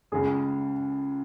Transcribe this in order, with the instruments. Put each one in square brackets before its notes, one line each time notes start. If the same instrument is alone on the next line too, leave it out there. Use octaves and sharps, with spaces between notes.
[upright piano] C#2 C#3 G#3 [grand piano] G#4